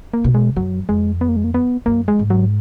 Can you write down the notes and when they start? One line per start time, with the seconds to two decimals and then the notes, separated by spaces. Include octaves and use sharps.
0.13 A#3
0.24 B2
0.35 G#3
0.56 F#2 F#3
0.89 F2 G#3
1.21 B3
1.29 A#3
1.36 G#3
1.44 A#3
1.54 B3
1.86 F#2 A#3
2.08 G#3
2.19 G#2
2.30 F#3